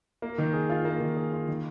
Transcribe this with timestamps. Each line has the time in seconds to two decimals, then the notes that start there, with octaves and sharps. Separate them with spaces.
0.22 A#3
0.38 D#3
0.53 G#4
0.70 F4
0.85 A#3
1.00 D#3
1.17 G#4
1.32 F4
1.48 D#3